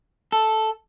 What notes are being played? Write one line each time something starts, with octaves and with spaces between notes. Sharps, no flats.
A4